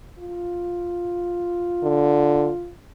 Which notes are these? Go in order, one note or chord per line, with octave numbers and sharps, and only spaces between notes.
F4
D3